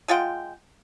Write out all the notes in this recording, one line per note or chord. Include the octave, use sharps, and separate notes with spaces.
G#3 F4 F#5 G5